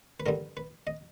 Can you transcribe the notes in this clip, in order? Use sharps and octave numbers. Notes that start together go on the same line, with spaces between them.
B4
G2 D3 G3 A#4
B4
D#5